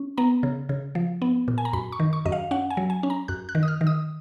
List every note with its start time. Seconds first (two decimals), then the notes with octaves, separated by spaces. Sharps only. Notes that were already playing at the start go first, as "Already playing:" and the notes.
Already playing: C#4
0.18 B3 A#5
0.43 C#3
0.69 C#3
0.95 F3
1.22 B3
1.48 A#2
1.58 G#5
1.65 A#5
1.73 F#2 B5
1.92 C#6
2.00 D#3
2.13 C#6
2.25 F#2 D#5
2.32 F5
2.51 C#4 F#5
2.70 G#5
2.77 F#3
2.90 G#5
3.03 C#4
3.10 A#5
3.28 F#2 F#6
3.49 F#6
3.55 D#3
3.63 D#6
3.68 F6
3.81 D#3
3.87 D#6